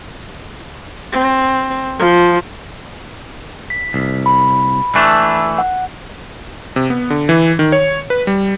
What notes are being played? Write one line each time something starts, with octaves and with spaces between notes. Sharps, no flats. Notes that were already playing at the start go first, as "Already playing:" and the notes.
C4
F3
B6
C2
B5
E3 A3 D4
F#5
C3
B3
D3
E3
D#3
C#5
B4
G3